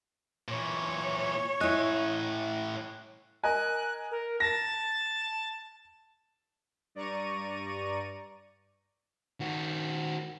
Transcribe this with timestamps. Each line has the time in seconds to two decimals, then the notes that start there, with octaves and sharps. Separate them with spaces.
0.48 A#2 E3 C#5
1.61 A2 E4 D#5 G#5 F#6
3.44 A#4 D#5 G#5 F#6
4.11 A#4
4.40 A5 A#6
6.95 G2 D5 A#5 C#6 D#7
9.40 D#3 F#4